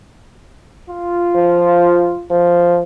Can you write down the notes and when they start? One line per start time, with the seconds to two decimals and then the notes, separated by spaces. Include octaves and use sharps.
0.90 F4
1.35 F3
2.31 F3